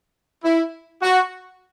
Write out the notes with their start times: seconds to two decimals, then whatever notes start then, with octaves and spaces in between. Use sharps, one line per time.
0.44 E4
1.02 F#4